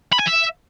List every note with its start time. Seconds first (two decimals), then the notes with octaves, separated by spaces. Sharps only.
0.13 B5
0.19 G#5
0.26 E5